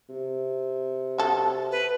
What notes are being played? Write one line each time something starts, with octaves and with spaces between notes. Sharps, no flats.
C3
F#4 A4
B4